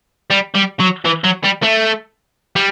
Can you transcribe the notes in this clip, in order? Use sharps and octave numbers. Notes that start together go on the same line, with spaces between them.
G3
G3
F#3
E3
F#3
G3
A3
G3